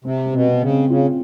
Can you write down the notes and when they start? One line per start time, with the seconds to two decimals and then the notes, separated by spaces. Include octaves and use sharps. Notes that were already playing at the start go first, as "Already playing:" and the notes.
0.04 C3 C4
0.26 C4
0.32 B2
0.47 C4
0.61 C#3
0.68 C4
0.89 C#3 F4